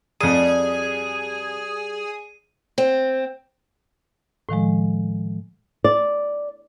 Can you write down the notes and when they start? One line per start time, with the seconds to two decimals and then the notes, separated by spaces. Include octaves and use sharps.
0.21 F2 G3 G#4 D#6 D#7
2.78 C4
4.49 A2 D#3 F3 G#3
5.84 D5